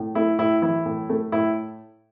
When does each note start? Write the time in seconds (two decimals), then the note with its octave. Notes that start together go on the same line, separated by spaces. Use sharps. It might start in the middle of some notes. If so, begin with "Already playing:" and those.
Already playing: A2
0.15 A3 E4
0.39 A2 E4
0.62 E3 E4
0.86 A2
1.10 A3
1.32 A2 E4